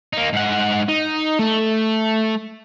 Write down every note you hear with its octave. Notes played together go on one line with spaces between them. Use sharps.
A#3 D#4
G#2 F#5
D#4
A3